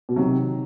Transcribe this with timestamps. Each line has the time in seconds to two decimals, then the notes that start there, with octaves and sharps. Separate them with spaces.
0.09 B2
0.16 C3 D#3 F#3